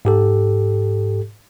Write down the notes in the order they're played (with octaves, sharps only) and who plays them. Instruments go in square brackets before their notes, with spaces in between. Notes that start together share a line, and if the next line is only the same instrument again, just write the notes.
[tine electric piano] G#2 G4 A4